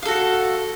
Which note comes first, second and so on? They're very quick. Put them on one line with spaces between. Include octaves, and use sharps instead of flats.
F5 A4 F#4